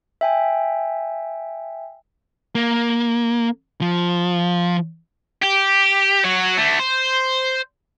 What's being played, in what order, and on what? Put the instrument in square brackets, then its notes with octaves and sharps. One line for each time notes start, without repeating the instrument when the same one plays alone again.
[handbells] E5 G5 G#5
[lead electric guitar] A#3
F3
[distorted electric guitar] G4
F#3 F#4
D3 A3
C5